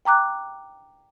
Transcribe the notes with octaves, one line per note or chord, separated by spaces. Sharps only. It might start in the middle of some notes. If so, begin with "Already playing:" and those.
G5 A#5 D6 F#6